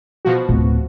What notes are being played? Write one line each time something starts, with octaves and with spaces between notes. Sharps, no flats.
B2 F3 F#4
D1